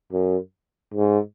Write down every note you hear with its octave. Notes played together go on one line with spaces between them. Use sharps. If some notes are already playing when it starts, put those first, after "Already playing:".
F#2
G#2